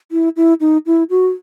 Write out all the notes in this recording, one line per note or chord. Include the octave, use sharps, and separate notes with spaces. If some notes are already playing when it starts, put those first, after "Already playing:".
E4
E4
D#4
E4
F#4